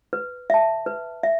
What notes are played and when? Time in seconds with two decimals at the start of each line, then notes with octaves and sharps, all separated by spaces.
0.13 B4
0.50 E5 A5
0.86 B4
1.23 E5